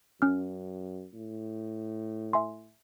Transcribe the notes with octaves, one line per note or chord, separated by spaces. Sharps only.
F#2 C#4 F6
A2
E5 G#5 C6